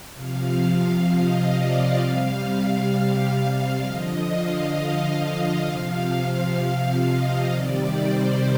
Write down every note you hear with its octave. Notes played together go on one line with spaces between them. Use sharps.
C3 F3 F5
D#5
D5
C3 G3 F5
D3 F3 D#5
F5
F5
C3 F3
F5
D#5
C3 D#3 G3 D5
C5